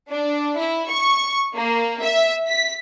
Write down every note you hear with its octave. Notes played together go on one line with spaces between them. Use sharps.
D4
E4
C#6
A#3
E5
B6